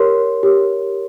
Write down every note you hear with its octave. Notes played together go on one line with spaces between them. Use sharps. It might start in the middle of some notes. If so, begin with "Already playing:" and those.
Already playing: G4 A#4 C#5 C6
G4 A#4 C#5